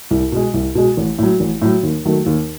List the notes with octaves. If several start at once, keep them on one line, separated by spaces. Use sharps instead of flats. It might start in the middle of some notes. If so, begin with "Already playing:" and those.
C2
B2 G#3
C2
B2 G#3
A1
A2 F#3
A1
A2 F#3
D#2
D#3 F#3 A3
D#2